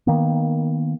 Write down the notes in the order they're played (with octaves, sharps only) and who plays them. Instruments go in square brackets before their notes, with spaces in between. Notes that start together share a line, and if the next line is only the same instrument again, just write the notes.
[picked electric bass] D#3 A#3 B3